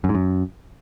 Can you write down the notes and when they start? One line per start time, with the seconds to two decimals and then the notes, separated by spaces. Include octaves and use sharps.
0.04 F#2
0.09 G#2
0.14 F#2